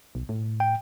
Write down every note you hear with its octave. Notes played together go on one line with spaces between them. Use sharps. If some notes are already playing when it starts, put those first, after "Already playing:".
B1
A2
G5